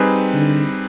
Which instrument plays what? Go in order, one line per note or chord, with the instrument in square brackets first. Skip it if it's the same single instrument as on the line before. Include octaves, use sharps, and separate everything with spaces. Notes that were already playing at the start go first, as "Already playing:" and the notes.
Already playing: [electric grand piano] G3 C4 D#4 G#4 B4
[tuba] D3